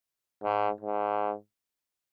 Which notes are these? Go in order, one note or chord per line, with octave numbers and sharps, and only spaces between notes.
G#2
G#2